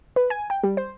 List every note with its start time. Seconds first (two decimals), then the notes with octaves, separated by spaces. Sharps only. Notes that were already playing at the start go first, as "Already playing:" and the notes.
0.16 B4
0.30 G#5
0.50 G5
0.63 G3
0.77 C5